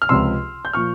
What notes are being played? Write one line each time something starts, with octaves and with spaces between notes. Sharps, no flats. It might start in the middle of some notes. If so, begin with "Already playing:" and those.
F6
C#2 C3 F3 C6 E6
G6
A#2 F3 C#6 F6